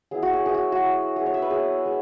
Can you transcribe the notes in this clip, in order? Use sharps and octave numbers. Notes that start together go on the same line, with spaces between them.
F#3 B3 E4 G#4
F#4
G#4
F#3 B3 E4 G#4
F#4
F#4
F#3 E4
G#3 B3 E4 G#4
C#5
E5
B4
G#3 B3 E4 G#4
G#3